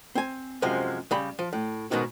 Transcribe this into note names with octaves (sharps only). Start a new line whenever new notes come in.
C4 G#5
F#2 C3 F3 G#3
C#3 G3 B5
F3
A2
G#2 B2 D#3 F#4